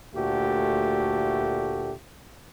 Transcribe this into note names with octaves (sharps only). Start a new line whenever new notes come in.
D2 A#2 A3 F#4 G4